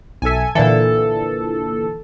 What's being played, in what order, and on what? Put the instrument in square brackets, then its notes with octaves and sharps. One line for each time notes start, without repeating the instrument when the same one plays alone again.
[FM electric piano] B1 E5 [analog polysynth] A4 G#5
[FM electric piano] A#2 D3 E3 [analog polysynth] A4